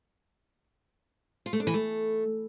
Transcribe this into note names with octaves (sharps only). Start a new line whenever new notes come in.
F4
A3
D4
E3
A3